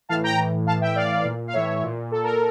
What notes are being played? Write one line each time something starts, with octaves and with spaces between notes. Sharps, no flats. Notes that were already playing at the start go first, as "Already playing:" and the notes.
A2 E3 F5 A5
G5 A#5
A2 E3
A2 E3 F5 A5
E5 G5
A2 E3 D5 F5
A#2
F5
A2 E3 C#5 E5
A#2
A#2 A4
A#4